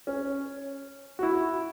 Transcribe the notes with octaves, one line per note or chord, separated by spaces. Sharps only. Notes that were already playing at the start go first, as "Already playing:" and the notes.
C#4
F#4
E4